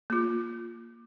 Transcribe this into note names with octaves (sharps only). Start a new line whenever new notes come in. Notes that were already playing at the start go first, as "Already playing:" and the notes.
A#3 F4